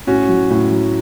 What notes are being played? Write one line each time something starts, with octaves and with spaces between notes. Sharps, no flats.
A2 C#4 F#4
F#3
A2
F#3